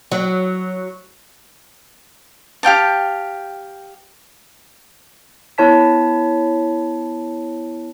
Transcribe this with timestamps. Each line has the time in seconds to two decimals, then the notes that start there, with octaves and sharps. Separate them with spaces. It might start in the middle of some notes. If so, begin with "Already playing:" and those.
0.12 F#3
2.63 G4 F5 G5 A5
5.58 B3 E4 C#5 A5 B6